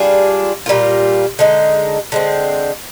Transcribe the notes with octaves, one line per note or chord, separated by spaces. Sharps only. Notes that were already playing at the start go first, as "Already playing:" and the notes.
Already playing: G3 D4 F4 G#4
A#2 G3 A#3 F4
D3 G#3 D#4
D3 G#3 C4